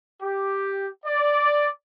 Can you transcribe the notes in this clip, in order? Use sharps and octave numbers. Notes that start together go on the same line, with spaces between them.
G4
D5